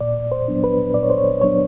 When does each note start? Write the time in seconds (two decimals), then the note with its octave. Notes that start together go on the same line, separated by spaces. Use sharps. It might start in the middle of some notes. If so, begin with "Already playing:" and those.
0.01 A#2 D5
0.32 C5
0.48 F#3 B3 D4
0.64 B4
0.94 A#2 D5
1.03 C#5
1.10 C5
1.18 C#5
1.41 F#3 B3 D4 C#5